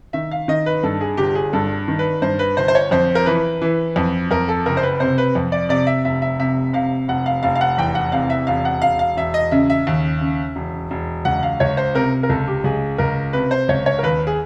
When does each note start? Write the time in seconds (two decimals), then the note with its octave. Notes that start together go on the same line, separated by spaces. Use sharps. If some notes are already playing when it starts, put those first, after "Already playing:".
0.13 D#3 E5
0.31 F5
0.48 D#3 D#5
0.66 B4
0.83 G2 A4
1.01 G#4
1.17 G1 G4
1.35 G#4
1.53 G2 A4
1.88 D#3
1.99 B4
2.22 G2 C5
2.39 B4
2.57 G1 C5
2.68 C5
2.75 C#5
2.91 F2 C5
3.15 A#4
3.26 E3 B4
3.62 E3
3.96 F2
4.31 F2 A#4
4.49 A4
4.66 F#1 A#4
4.77 C5
4.83 B4
5.00 C3 C5
5.18 B4
5.35 F2
5.52 D5
5.69 C3 D5
5.87 E5
6.05 F1 E5
6.22 E5
6.39 C3 E5
6.73 C3 F5
7.08 F1 F#5
7.26 F5
7.43 F1 F5
7.55 F5
7.61 F#5
7.78 E2 G5
7.95 F#5
8.12 C3 F5
8.30 E5
8.47 E1 F5
8.65 F#5
8.82 E1 F5
8.99 F5
9.17 E1 E5
9.34 D#5
9.51 C#3 E5
9.70 E5
9.87 D#2
10.21 C#3
10.56 E1
10.91 E1
11.25 C#2 F#5
11.43 F5
11.60 C#2 C#5
11.77 C5
11.95 C3 A#4
12.23 A#4
12.29 C#2 A4
12.48 G4
12.64 C#2 G#4
12.98 C#2 A#4
13.33 C3 B4
13.51 C5
13.69 C#2 C#5
13.86 C#5
13.99 A#4
14.03 D#2 B4
14.27 G#4